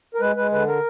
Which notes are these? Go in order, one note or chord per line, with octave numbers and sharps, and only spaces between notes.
A#4
G#3 B4
G#3 B4
D3 B4
A#4